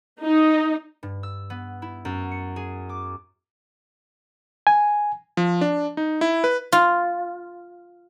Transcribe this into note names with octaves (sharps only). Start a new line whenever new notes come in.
D#4
G2
E6
B3
E4
F#2
C#7
G#4
D6
G#5
F3
D4
D#4
E4
B4
F4